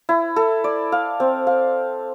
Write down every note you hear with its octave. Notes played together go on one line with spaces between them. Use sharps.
E4
A4
D5
F5
C4
F5